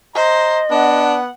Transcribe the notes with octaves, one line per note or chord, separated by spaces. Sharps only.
C5 D#5 A#5
B3 D4 F#5